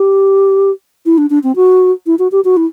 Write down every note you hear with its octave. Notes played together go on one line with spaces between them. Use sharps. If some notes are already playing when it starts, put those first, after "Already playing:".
Already playing: G4
E4
D4
D4
C4
F#4
E4
F#4
G4
F#4
E4